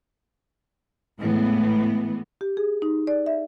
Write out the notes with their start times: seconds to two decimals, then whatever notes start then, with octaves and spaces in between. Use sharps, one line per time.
1.20 A2 E3 G#3 B3
2.41 G4
2.57 G#4
2.82 D#4
3.07 D5
3.26 E5